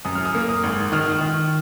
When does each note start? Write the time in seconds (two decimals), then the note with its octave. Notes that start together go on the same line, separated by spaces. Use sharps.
0.05 F#2 D#6
0.15 F6
0.25 D#6
0.35 A#3
0.49 D#6
0.63 G#1
0.92 D#3 F6
1.21 D#3